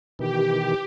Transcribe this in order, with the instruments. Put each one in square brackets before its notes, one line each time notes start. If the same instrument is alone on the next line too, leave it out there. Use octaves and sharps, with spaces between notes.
[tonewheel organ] B2 D#3 E3 [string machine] G4